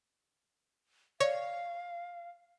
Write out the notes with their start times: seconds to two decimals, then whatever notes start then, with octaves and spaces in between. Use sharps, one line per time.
1.20 C#5 D5 F5